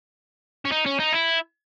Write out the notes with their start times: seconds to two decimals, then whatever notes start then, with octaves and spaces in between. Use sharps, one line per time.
0.65 C#4
0.72 D#4
0.86 C#4
0.99 D#4
1.13 E4